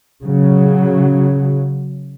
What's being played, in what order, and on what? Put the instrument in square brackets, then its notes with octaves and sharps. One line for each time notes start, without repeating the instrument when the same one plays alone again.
[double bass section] C#3 F#3